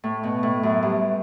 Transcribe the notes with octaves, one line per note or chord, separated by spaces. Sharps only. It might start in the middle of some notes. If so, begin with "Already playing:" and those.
A2
B2
A2
F#2
G2